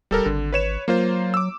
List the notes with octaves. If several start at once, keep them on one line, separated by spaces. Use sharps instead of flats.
D1 G3 A4 A#4
G#1 D3
B4 C#5 E7
F#3 A#3 F4 C5
D6 E6